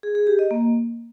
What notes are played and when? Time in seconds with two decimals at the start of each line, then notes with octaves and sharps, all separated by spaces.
0.03 G#4
0.15 G#4
0.27 G4
0.39 D#5
0.51 A#3